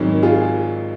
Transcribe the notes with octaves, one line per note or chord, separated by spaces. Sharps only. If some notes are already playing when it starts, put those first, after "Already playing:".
Already playing: G#1 G#2 D#3 F#3
F4 G#4